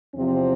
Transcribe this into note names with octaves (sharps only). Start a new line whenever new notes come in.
E2 C3 F3 C4